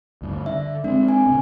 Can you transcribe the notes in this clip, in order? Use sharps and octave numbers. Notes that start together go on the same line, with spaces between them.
D2 G2
D3 E5
G#3 C4 D4
G#5
D2 C3